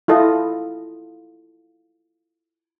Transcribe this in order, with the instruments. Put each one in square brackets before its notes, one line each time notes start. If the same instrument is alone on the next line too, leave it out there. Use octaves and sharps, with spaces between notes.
[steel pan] E4 F4 A4 D#5